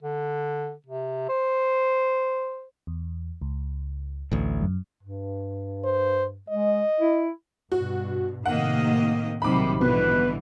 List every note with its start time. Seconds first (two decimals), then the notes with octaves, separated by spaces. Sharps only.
0.03 D3
0.86 C3
1.29 C5
2.87 E2
3.42 C#2
4.32 A1 D2
4.61 F#2
5.03 G2
5.85 C5
6.49 G#3 D#5
7.00 E4
7.72 G2 B2 F#4
8.46 A2 C3 D#3 A#3 D#5 F#5
9.42 A#1 G#2 C3 D#3 F#3 G3 B5 D6
9.81 B2 D3 E3 B4